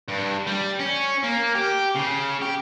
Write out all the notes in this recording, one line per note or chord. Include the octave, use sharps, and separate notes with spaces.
G2
G3
C#4
A#3
G4
C#3
G4